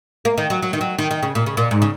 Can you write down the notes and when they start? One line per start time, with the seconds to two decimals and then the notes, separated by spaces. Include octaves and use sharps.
0.25 A#3
0.38 D#3
0.50 F#3
0.62 F#3
0.73 D#3
0.81 F#3
0.98 D#3
1.11 D#3
1.23 C#3
1.35 A#2
1.46 C#3
1.57 A#2
1.71 G#2
1.82 C#3